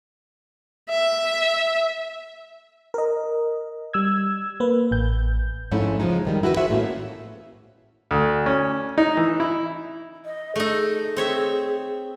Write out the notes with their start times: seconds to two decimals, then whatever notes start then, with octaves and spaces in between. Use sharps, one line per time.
0.89 E5
2.94 A#4 D#5
3.93 G3 E6 G#6
4.60 A#3 B4
4.91 A1 G6
5.71 F2 G#2 A3 C#4 E4
6.00 C#3 F3 F#3 G#3 D#4
6.25 F#2 D#3 G3
6.43 E4 F#4 G4 B4
6.57 F#4 G#4 C5 E5
6.70 A2 A#3 C#4
8.11 D2
8.46 C#4
8.98 D#4
9.17 E3
9.40 E4
10.25 D#5
10.56 A3 D#4 G#4
11.16 C4 C#5 E5